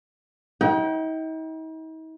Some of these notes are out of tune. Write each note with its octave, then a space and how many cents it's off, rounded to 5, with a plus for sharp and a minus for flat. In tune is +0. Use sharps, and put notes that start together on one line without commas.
D#4 +45 G5 -25